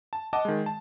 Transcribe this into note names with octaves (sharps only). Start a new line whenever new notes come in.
A5
D#5 F#5 A5 D6
D#3 G#3
A5